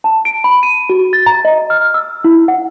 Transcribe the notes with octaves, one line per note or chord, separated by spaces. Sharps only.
A5
D7
B5
D#7
F#4
A6
A#5
D#5
F6
E6
E4
F#5